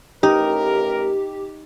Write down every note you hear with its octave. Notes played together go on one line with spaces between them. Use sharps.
A1 D#4 G4 A#4